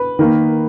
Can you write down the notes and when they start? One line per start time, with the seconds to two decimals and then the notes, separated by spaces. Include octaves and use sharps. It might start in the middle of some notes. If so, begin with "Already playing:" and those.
Already playing: B4
0.19 D#3 A#3